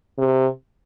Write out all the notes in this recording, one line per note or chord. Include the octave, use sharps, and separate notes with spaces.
C3